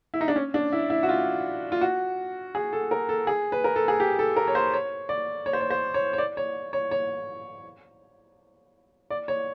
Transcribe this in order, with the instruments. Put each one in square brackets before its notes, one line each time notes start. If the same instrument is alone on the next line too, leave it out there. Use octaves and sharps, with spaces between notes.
[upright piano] E4
D#4
D4
C#4
D4
E4
E4
F#4
F4
F4
F#4
G#4
A4
A#4
A4
G#4
B4
A#4
A4
G#4
G4
A4
A#4
C#5
C5
C#5
D5
C#5
C5
C#5
C5
C#5
C#5
D5
C#5
C#5
C#5
D5
C#5